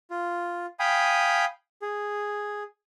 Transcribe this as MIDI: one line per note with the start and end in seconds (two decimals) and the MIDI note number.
0.11 0.66 65
0.79 1.45 77
0.79 1.45 79
0.79 1.45 80
0.79 1.45 83
0.79 1.45 87
1.82 2.63 68